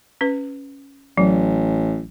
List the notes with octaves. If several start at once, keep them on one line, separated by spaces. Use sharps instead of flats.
C#4 B4
A1 F#3